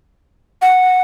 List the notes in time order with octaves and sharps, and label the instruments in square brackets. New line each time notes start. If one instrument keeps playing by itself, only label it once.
[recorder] F#5